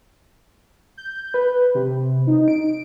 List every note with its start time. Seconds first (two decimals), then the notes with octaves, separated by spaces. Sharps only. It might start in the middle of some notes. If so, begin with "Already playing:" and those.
0.97 G6
1.34 B4
1.75 C3
2.27 D#4
2.48 D7